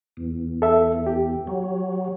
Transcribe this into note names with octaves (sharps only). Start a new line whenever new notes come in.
E2
A4 E5
G4
F#3